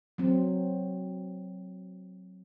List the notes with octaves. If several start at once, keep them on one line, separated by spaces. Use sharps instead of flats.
F#3 C4